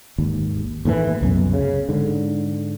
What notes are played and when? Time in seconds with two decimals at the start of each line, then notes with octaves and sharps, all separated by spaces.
0.18 G#1 D#2
0.85 D#2 A2 D#3 E3
1.21 C2 F#2 B2
1.53 C#3
1.89 G#2 D3